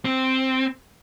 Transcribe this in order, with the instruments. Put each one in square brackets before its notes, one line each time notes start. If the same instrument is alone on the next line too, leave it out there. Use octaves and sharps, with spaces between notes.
[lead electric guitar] C4